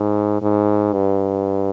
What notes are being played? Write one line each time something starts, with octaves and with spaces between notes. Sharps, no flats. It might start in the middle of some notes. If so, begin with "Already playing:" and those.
Already playing: G#2
G#2
G2